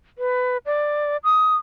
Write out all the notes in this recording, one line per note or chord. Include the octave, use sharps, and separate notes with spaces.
B4
D5
D#6